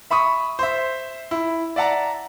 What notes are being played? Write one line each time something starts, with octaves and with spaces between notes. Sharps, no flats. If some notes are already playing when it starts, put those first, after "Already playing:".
E5 B5 C#6 D#6
C5 E5
E4
D5 E5 F#5 A5 A#5